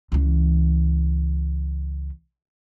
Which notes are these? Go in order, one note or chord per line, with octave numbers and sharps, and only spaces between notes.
C#2 E3